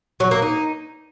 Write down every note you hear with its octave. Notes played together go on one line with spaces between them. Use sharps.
F#3
A#3
D#4